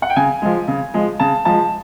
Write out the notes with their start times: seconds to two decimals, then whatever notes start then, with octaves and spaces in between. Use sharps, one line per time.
0.02 F#5
0.10 G5
0.16 C#3 G#5
0.42 F3 G#3
0.68 C#3
0.94 F3 G#3
1.20 C#3 A5
1.45 F3 G#3 A5